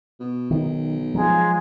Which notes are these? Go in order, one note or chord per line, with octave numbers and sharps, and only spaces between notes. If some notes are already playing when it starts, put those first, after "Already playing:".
B2
B1 D#3
F3 F#3 G#3